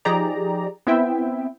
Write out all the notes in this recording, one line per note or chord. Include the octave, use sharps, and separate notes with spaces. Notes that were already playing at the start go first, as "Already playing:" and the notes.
F3 D#4 G4 G#4 D5 A#5
B3 C4 E4 E5 G5